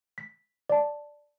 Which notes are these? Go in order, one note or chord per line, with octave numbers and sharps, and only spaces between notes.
B6
D5 A5